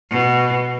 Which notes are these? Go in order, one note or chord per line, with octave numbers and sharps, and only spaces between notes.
B2